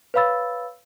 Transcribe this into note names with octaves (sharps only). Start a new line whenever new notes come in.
B4 C#5 F5 B5 E6 A6